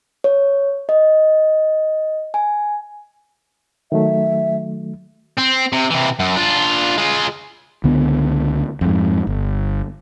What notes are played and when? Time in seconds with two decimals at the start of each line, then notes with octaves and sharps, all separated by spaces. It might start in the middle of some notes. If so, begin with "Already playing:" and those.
0.24 C#5
0.89 D#5
2.34 G#5
3.92 D#3 F#3 A3 E5
5.38 C4
5.73 C3
5.90 C3 E3
6.19 F#2
6.36 D4 F4
6.98 G#3 F4
7.84 C#2 D3 B3
8.81 F2 G#2
9.27 G1